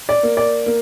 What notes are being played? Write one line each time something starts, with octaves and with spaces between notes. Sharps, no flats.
D5
A#3
D5
A#3